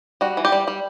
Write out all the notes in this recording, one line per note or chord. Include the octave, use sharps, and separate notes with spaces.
G3 F#4
E3
G4
G3
G3